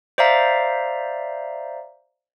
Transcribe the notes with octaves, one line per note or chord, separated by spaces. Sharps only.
C5 D5 E5 F5 A#5